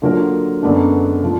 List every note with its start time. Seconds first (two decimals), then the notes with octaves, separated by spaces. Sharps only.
0.02 D3 F#3 A#3 F4 A#4
0.62 F#2 D3 G#3 B3 D4
1.23 F3